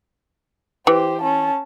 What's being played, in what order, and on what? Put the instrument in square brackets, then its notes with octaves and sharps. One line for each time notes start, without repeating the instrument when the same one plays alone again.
[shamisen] E3 [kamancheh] G4 C5
[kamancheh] C#4 A5